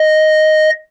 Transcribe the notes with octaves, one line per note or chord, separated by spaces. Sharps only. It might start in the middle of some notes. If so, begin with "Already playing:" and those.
Already playing: D#5